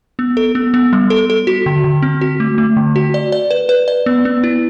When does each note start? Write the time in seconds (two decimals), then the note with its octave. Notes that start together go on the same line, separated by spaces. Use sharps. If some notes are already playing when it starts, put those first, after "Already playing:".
0.19 B3
0.37 A4
0.55 B3
0.74 B3
0.93 G3
1.10 A4
1.30 A4
1.47 F#4
1.66 D3
1.84 D3
2.02 C4
2.21 F#4
2.40 A3
2.58 A3
2.77 D3
2.96 F#4
3.14 D5
3.32 D5
3.51 B4
3.69 B4
3.88 D5
4.06 B3
4.25 B3
4.43 E4